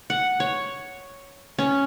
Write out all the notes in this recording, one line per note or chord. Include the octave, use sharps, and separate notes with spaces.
F#5
C#5
C#4